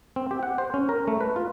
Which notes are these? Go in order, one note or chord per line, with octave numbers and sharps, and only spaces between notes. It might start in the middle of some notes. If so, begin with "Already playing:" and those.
C4
G4
F#5
C5
C#4
A#4
A3
B4
F4